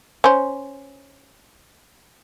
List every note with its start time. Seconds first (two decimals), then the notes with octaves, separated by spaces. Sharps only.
0.24 C#4 C5